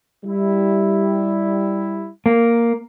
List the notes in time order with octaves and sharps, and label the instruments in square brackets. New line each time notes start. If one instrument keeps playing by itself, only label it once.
[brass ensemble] G3 E4
[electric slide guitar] A#3